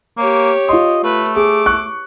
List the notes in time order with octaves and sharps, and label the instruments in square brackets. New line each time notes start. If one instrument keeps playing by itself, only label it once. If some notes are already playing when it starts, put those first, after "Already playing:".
[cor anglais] A#3 [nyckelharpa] G4 C#5
[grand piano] F4 C6 [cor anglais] D#5
[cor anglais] A3 [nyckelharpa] B4
[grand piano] G#4 [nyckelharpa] D6
[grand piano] C#6 F#6